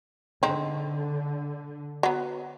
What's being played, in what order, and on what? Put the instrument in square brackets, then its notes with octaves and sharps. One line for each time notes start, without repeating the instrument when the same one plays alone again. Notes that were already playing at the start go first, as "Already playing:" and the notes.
[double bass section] D3 [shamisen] G#3 C4 D#4
[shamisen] F#3 B3